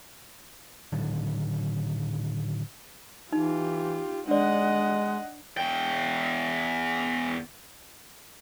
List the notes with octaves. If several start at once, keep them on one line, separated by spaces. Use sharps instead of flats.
A2 D3 D#3 F#3
E3 D#4 F4 G4
G#3 D4 D5 D#5 F#5
E2 G5